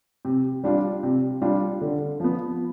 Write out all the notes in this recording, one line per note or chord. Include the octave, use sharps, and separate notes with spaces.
C3
G3 D4 F4
C3
G3 D4 F4
D3
F3 B3